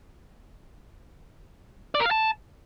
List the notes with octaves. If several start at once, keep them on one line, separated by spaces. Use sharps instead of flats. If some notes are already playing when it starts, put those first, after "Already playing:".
D5
A#4
F5
A5